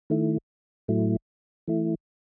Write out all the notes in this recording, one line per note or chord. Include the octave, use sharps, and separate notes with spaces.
D#3 A3 E4
A2 F#3 A3 E4
E3 A3 E4